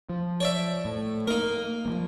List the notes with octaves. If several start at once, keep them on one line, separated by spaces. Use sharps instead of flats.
F3
C#5 D5 E5
A2
A#3 D#4 A#4
F3 F#3 A#3